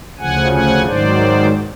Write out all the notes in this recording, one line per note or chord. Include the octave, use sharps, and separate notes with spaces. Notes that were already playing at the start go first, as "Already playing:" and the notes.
D2 C#3 F3 F#5 G#5
F#5 G#5
G#2 D#3 F#3 C5 D5